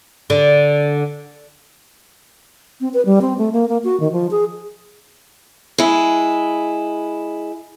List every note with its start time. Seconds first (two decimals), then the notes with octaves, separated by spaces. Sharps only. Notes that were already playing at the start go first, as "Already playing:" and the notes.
0.30 D3
2.81 C4
2.94 B4
3.05 G3
3.22 C4
3.38 A3
3.53 A#3
3.69 A#3
3.84 F#4
4.00 D#3
4.12 F3
4.31 G#4
5.78 G#3 E4